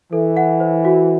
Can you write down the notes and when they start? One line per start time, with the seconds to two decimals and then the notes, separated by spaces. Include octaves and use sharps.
0.13 E3 A4
0.37 F#5
0.60 C5
0.85 F#4